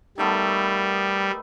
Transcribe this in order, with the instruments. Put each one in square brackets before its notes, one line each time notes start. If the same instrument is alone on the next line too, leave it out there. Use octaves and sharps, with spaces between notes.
[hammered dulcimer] D#3 A3 B3 [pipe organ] G3